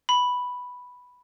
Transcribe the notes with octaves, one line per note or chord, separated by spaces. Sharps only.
B5